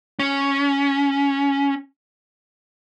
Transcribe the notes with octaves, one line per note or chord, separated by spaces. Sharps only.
C#4